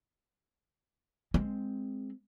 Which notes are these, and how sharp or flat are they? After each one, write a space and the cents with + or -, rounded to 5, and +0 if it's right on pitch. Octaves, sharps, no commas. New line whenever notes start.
G#3 +0 C4 +0